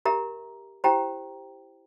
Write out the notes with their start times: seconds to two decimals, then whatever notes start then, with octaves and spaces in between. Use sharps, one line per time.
0.06 G4 A#4 E5 A#5
0.84 E4 G4 C5 G5 A#5